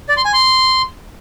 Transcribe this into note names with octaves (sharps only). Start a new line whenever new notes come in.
D5
C6
G#5
C6